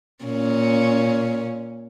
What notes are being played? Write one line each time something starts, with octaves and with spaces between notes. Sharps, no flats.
A#2 C#4